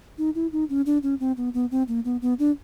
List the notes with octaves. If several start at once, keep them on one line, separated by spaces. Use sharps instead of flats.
D#4
E4
D#4
C#4
D4
C#4
C4
B3
B3
C4
A#3
B3
B3
D4